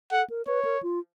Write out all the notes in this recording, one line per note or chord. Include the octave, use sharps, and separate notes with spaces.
A4 F#5
A#4
B4 C#5
A#4
F4